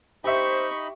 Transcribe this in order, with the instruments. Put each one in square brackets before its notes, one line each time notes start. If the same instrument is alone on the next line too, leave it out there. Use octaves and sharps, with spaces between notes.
[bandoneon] D#4 D#5 B5 [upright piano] G4 E5 [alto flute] C5 [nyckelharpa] C#6